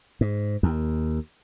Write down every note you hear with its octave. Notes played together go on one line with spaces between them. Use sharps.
G#2
D#2